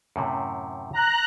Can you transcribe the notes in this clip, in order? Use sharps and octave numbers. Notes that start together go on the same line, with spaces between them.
F#2 A2 C3
A#5 F#6